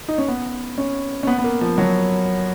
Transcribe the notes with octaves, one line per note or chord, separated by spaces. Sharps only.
D#4
C#4
B3
C#4
C#4
B3
B3
A#3
F3
F#3